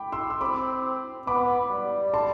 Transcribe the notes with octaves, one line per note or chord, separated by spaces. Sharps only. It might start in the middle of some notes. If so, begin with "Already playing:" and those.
Already playing: G5 B5 D6
C6 E6
E6
C4 B5 D6
B3 B5 D6
G3
A5 C6